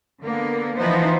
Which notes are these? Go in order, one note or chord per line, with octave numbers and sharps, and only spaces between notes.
D3 A#3 B3
E3 F3 B3 D#4 C5